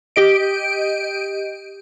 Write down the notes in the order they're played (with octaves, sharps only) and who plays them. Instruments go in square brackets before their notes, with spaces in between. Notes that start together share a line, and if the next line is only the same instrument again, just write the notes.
[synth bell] G4 D#5 D7